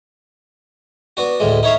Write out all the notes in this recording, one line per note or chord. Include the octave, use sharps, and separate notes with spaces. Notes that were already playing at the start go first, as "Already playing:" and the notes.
B3 D4 F#4
D2 A2 G#3
D#4 E4 C#5 E5 F5